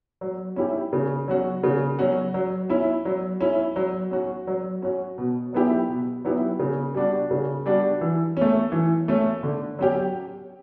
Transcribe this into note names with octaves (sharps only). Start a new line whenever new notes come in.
F#3
C#4 E4 G4
C#3
F#3 C#4 F#4
C#3
F#3 C#4 F#4
F#3
C#4 E4
F#3
C#4 E4
F#3
C#4 F#4
F#3
C#4 F#4
B2
F#3 B3 E4 G4
B2
F#3 B3 E4 G4
C#3
G3 D4 F#4
C#3
G3 D4 F#4
E3
A3 C#4
E3
A3 C#4
D3
F#3 C#4 G4